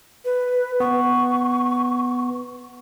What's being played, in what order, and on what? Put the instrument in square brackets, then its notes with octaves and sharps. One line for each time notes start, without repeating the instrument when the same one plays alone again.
[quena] B4
[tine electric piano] B3 [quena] C#6